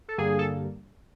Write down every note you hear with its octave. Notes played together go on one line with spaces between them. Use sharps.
A4
G2 D3 G3 A#3 G#4
A4